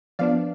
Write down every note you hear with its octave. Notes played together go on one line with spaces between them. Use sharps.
F3 B3 D4 D5 F5